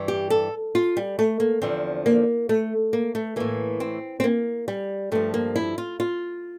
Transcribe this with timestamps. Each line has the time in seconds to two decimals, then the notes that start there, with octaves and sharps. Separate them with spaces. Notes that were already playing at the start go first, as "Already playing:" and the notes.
Already playing: G2 E3
0.08 G4
0.30 A4
0.75 F4
0.97 G3
1.19 A3
1.40 A#3
1.62 E2 D3 F3 C4
2.06 A#3
2.49 A3
2.93 A#3
3.15 A3
3.36 A2 E3 A#3
3.80 C4
4.20 C4
4.24 A#3
4.68 G3
5.12 G2 F3 A3
5.34 A#3
5.56 E4
5.78 F4
6.00 F4